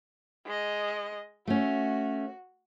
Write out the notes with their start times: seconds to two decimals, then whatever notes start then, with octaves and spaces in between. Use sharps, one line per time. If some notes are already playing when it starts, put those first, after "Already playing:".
0.46 G#3 D#5
1.47 A3 C#4 F#4